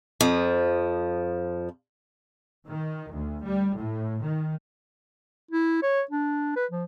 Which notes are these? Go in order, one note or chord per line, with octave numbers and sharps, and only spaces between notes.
F2 F3
D#3
D2
G3
A2
D#3
E4
C#5
D4
B4
F3